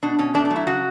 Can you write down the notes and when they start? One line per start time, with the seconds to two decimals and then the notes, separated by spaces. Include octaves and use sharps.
0.03 B2 D4
0.19 B2 C#4
0.34 A3 D4
0.45 D4
0.50 F#3
0.56 E4
0.67 C#3 F#4